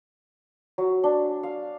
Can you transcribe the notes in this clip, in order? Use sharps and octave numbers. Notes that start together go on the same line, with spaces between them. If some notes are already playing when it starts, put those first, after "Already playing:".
F#3
D4
F5